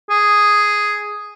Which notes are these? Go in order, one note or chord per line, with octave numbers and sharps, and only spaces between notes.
G#4